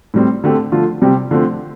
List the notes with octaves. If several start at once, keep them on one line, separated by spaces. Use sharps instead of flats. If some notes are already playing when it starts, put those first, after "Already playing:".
A2 G3 C4
D3 A3 C4 G4
D3 F3 A3 F4
C3 G3 C4 G4
D3 F3 A3 C4